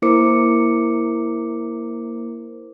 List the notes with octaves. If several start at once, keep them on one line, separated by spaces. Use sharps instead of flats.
A#3 E4 A#4 C5 D6 C#7